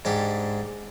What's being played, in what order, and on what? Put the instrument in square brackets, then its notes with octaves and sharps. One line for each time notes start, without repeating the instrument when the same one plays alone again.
[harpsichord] G#2 D4 G4